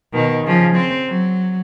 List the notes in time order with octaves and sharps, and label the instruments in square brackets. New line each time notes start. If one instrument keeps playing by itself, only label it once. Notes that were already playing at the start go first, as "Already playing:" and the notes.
[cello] B2 D#3
C#3 F3
C4
F#3